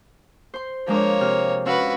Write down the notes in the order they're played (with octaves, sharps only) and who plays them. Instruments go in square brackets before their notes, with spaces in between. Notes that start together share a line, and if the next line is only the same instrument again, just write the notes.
[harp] C5 C6
[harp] F3 G#3 D4 [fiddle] A#3 C#5
[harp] C3 F6
[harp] C#4 F5 E6 [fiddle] F#4 B4